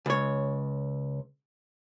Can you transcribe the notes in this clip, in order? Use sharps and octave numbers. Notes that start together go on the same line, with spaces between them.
C#2 C#5